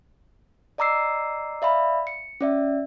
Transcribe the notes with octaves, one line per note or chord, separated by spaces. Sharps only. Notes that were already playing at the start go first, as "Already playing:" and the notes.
D5 D#5 A#5 D6 E6 C7
D5 E5 F5 B5
C#7
C#4 D5 E5